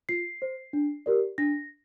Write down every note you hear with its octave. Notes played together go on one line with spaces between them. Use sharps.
F4 C7
C5
D4
G4 A#4 D5
D4 A#6